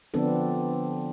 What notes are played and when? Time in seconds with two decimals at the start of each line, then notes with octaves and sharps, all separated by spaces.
0.14 D3 F3 B3 C4 D4 A4